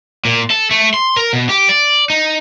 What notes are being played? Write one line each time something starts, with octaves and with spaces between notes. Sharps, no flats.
A#2
A4
A3
C6
A#4
B2
G4
D5
D#4